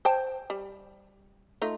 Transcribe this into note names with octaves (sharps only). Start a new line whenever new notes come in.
C5 G5 A5
G3
A3 D#4 F4